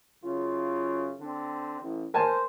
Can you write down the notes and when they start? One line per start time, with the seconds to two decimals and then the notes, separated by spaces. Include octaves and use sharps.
0.23 F#2 C#3 F4
1.20 D3 C4
1.81 A1
2.14 A#4 C5 G#5 A5